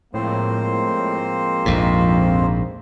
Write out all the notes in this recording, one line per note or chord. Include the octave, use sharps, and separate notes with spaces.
A2 F3 G#3 A#3 C4 C5
A#1 F2 G#2